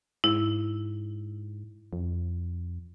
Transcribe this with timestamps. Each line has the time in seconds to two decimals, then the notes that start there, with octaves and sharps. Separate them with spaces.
0.24 G#2 E4
1.93 F2